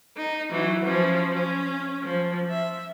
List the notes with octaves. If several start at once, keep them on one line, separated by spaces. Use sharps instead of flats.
D#4
E3 F#3
F3 C#4
C#4
F3
E5